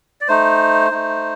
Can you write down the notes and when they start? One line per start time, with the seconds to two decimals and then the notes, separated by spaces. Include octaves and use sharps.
0.21 D5
0.28 A3 D#4 C5
0.91 A3 D#4